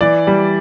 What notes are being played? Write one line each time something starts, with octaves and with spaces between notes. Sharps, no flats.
E3 D5
G3